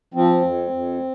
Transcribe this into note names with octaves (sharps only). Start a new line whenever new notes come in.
F3 C4
F2
F2